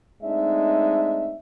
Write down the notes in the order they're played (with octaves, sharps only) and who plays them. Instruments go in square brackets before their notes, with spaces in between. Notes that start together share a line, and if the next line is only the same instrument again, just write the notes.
[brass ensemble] G#3 A3 C4 D4 D#4 E5